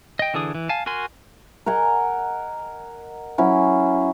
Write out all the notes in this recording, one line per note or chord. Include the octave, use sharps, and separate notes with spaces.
D#5 G5
D3 E3 D4 G#4 D#6
E3
F5 G#5 A5
F#4 A#4 G#5 C6
A#4 D#5 F#5 G#5
F#3 C#4 E4